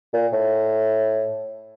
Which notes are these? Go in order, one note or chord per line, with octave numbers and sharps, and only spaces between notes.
A#2
A2